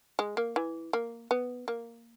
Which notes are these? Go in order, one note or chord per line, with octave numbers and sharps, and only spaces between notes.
G#3
A#3
E3
A#3
B3
A#3